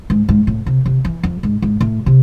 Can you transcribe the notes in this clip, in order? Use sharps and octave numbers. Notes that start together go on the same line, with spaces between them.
G#2
G#2
A2
C3
C3
E3
F2
G#2
G#2
A2
C3